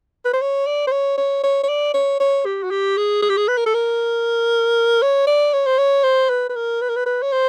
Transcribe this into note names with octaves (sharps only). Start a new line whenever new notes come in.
B4
C5
C#5
D5
C5
C#5
C#5
C#5
C#5
D5
C#5
C#5
G4
F#4
G4
G#4
G#4
G4
G#4
B4
A#4
A4
A#4
C#5
D5
C#5
C5
C#5
C5
B4
B4
A#4
B4
A#4
B4
B4
C#5
C5